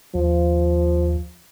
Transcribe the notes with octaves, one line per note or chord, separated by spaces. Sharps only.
D#2 F3